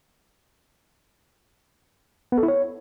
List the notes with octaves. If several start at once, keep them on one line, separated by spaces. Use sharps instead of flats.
B3
A4
E4
C#5